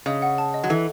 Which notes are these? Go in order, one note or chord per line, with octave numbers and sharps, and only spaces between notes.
C#3 D#5
F#5
A5
D#5
F#3
E3 A4